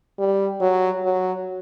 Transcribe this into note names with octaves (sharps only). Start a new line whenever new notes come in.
G3
F#3
F#3